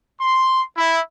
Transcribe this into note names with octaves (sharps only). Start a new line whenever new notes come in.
C6
E4